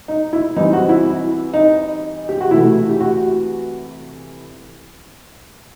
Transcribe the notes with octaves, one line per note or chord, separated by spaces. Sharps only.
D#4
E4
E3 G3 C4 D#4
F#4
E4
D#4
G4
F#4
C3 E3 A3 E4
G4
F#4